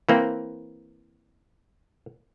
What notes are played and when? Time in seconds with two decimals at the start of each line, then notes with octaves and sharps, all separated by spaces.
0.09 E3 A#3 C4